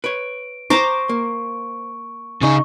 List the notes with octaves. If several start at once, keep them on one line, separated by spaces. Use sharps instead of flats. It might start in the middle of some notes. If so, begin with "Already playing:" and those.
B4 C#5 D7
C5 A#5 C#6 D6
A#3
C#3 D#4 G#4 C#6